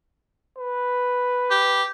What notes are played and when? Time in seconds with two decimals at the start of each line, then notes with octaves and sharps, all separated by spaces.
0.58 B4
1.51 G4